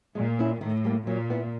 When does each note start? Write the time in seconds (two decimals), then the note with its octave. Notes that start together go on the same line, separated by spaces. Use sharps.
0.15 A#2 G#3
0.39 C#4 E4
0.61 A2 D#3
0.84 G3 A#3
1.07 A#2 F#3
1.30 B3 E4